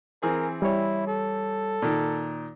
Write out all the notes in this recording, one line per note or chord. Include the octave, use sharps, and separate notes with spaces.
E3 C4 G#4 A#4
G3 E4 C#5
A4
A#2 D#3